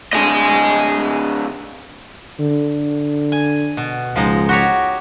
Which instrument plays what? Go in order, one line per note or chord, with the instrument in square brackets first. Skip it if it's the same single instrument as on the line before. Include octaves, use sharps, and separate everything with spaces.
[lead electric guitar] A2 D3 [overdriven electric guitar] D#5 G#5
[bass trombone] D3
[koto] G#5
B2
[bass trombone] C#2 [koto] F3 G#3 D#4
[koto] F#4 G4 C#5